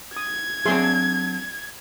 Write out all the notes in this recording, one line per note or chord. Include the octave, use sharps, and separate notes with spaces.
D#6 G#6
F#3 C4 D4 G#4 E5 C6